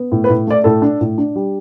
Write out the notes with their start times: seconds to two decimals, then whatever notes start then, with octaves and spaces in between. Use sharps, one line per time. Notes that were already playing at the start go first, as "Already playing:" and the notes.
Already playing: B3
0.12 A2
0.24 B4
0.29 A2
0.47 A3 D5
0.64 A2 A4
0.82 D4
1.01 A2
1.18 D4
1.35 G3